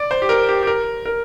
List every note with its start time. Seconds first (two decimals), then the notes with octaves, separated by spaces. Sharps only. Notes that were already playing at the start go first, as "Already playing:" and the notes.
Already playing: D5
0.11 C5
0.22 G4
0.29 A#4
0.49 G4
0.63 G4
0.67 A#4
1.06 A#4